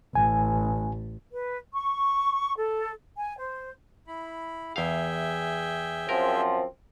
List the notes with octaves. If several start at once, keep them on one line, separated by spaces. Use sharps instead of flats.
A1 G#5
B4
C#6
A4
G#5
C5
E4 B5
E2 G#4 E5 F5 G5
F#2 F3 C4 A#4